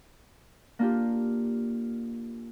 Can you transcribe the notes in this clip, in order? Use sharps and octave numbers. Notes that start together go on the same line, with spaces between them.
A#3 D4 F4 G4